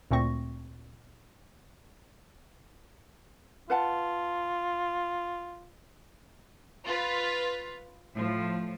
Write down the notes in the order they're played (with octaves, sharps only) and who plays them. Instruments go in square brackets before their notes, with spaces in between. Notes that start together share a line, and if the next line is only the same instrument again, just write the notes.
[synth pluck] D2 A#2 A3 C4 C#6 A#6
[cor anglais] F4 [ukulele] B4 F#5 A5
[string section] F4 B4
A2 F3